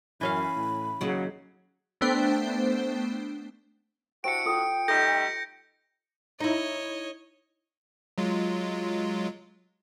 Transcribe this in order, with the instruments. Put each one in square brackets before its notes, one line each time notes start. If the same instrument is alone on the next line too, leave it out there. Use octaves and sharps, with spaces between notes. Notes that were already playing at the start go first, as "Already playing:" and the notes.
[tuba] F#2 [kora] E3 C#4 F5 [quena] B5
[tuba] A2
[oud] D#2 C#3 [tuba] F#3
[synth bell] A3 B3 D4 C5 G5
[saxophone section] D4 E4 F#4 [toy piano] G4 C5 G5 [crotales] C#7 D7
[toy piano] F4 A4 D#6 [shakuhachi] G5
[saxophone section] G3 A3 D#4 [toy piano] A4 [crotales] G6 A#6
[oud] D#4 E4 [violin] C#5 D#5
[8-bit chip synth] F#3 G#3 F4